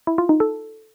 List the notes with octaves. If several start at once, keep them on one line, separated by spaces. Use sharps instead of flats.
E4
F4
D#4
A4